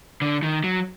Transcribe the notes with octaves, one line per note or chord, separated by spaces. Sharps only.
D3
D#3
F#3